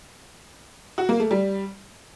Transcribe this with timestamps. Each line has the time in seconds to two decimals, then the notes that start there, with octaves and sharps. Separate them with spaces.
0.98 F#4
1.09 A#3
1.20 A3
1.31 G3